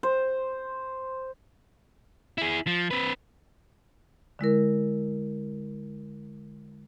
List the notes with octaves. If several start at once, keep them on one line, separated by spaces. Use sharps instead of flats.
C5
E4 G#4
F3
C4 B4
D3 G#3 E4 A#4